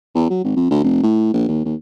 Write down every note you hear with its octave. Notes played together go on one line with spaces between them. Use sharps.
E2
F#3
G#1
F2
D2
F1
A2
A#1
D#2
D#2